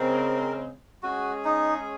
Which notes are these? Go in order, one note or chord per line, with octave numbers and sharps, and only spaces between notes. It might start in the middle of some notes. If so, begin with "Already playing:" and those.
Already playing: C#3 G#3 C4 A#4
G#3 C#4 F#4 G#4
D#4